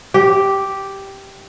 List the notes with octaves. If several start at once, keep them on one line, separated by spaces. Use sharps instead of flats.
G4